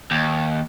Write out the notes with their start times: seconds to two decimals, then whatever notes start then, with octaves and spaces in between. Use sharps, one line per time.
0.11 D#2